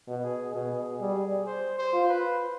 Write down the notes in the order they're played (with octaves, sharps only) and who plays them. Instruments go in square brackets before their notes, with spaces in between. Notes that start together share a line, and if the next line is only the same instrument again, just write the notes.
[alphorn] B2
[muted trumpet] G#4
[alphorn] B2 [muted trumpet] G#4
[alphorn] G3 [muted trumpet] G#4
[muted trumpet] C5
C5
[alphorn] F4
[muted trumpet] B4